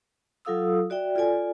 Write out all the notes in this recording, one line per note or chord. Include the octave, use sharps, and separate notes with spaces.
F#3 F4 A4 F5 D#6 E6
F#4 D5 E5 G5
F4 A4 D5 G#5